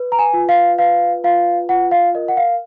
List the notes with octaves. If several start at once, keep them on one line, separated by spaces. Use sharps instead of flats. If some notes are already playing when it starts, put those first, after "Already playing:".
Already playing: B4
A#5
G#5
F4
F5
B4 F5
F4 F5
F4 F#5
F5
A#4 D#5
F#5
F5